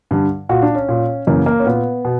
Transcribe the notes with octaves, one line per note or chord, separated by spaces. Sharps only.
G2 D3
A#2 F#4
D4
C#4
A#2
F#2 C#3 E3 A#3
A#3
C#4
A#2 B3
B2